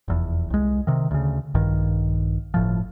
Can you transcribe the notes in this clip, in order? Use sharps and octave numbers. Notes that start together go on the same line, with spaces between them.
F1 E2
C2 G#3
C3 D#3
D2 C#3
A#1 G2 D#3
G1 A2 F3